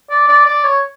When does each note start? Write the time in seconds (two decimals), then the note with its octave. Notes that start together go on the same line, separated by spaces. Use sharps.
0.10 D5
0.28 D5
0.46 D5
0.64 C#5